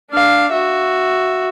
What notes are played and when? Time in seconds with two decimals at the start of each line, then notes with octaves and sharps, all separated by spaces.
0.11 D4 F5
0.52 F#4 E5